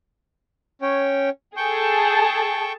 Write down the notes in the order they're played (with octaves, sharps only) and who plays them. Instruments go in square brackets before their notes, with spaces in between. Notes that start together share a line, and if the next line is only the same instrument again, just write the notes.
[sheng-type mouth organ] C#4 C#5 G5
[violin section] G#4 A4 A5 [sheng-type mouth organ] G5 C#6 G6